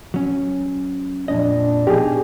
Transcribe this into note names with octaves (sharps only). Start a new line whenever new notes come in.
F#3 C#4
F2 A#2 D4 D#5
B2 D#4 G4 G#4